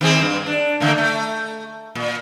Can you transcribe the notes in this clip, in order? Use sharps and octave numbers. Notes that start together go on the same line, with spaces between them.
D#3 C4 G#4
G2
D4
D3 A3 A#3
A3
A#2